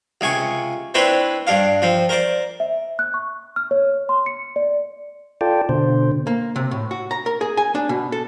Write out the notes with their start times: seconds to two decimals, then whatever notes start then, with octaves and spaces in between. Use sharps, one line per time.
0.21 C#2 C3 G#5 C#6
0.94 C4 D4 E4 B4 C#5 C6
1.47 G2 D4 F5
1.82 F3 C4
2.09 A#4 C5 D5
2.60 E5
2.99 F#6
3.14 C#6
3.56 F6
3.71 C#5
4.09 C6
4.26 C#7
4.56 D5
5.41 F4 A4 D5 G5
5.69 B2 D3 C5
6.27 A#3
6.56 C3
6.71 A2
6.91 F#4
7.11 A#5
7.26 A#4
7.41 G#4
7.57 G#5
7.75 D4
7.89 B2
8.12 A4